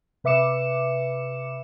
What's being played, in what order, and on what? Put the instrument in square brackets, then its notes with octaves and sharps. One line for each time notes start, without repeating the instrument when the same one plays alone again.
[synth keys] C3 B4 E5 D6 C#7 E7